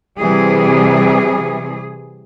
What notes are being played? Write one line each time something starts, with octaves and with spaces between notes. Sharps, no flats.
C3 E3 G3 G#4